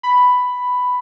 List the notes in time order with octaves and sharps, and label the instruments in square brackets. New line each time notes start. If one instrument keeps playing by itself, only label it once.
[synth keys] B5